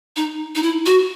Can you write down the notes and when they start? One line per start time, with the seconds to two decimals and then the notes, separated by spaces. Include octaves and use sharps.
0.16 D#4
0.56 D#4
0.63 E4
0.86 F#4